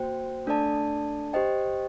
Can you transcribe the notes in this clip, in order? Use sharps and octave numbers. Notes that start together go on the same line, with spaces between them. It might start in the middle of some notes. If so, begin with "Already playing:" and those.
Already playing: A#3 F#4 C5 G5
A3 D4 A4 D5 A5
G4 C5 D#5 G5